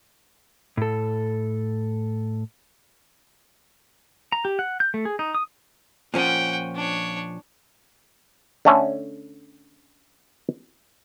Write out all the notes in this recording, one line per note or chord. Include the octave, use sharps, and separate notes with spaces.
A2 A4
A#5
G4
F#5
G6
A3
G#4
D#4
D#6
A#2 F3 C#4 F#5 G5
D4 C#5
D3 A3 C#4